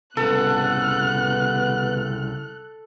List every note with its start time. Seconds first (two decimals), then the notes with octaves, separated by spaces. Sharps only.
0.17 C2 C#3 B3 A4 F#6